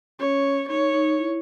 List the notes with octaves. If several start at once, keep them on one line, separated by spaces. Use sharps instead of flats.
C#4 C#5
D#4 C#5
D#4
E4